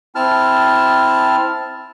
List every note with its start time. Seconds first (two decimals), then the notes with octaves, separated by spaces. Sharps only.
0.15 C4 E4 A5 F6